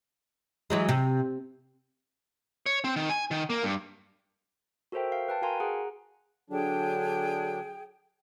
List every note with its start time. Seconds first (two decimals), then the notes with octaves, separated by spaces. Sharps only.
0.70 E3 F#3 G#3
0.89 C3
2.66 C#5
2.84 C4
2.96 D#3
3.09 G#5
3.31 D#3
3.50 A#3
3.64 G2
4.92 F#4 A4 A#4 C5 E5 G5
5.12 F5
5.29 B4 G5 A5
5.42 F#4 A#4 F5 G#5 A#5 C6
5.60 G#4 F#5 A#5
6.50 D3 F#3 D4 G#4 G5